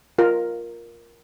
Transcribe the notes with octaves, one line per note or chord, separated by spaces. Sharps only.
F4 A#4